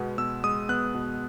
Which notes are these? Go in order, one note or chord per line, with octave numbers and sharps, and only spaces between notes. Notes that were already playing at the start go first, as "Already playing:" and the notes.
Already playing: B2 G#3 B3
B2 E6
G#3 D#6
B3 F#6
B2